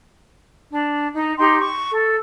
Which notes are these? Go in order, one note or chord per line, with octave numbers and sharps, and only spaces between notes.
D4
D#4
D#4 G4 G5 C6
C#6
A4